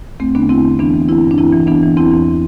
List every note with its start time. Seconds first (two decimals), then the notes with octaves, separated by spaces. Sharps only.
0.20 E2 A3 C4
0.35 D3 B3 D4
0.49 D3 C4 E4
0.64 E2
0.79 E3 B3 D4
0.94 E3
1.09 E3 C4 E4
1.24 G2
1.31 D4
1.38 E3 C4 E4
1.53 E3
1.67 E3 B3 D4
1.83 E3
1.97 E2 C4 E4
2.11 E3